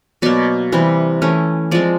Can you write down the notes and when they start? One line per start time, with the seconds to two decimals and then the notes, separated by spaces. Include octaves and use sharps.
0.22 B2 F#3 A#3 D5
0.72 C3 E3 G3 C4
1.22 E3 A3 C#4
1.71 F3 G#3 C4 D5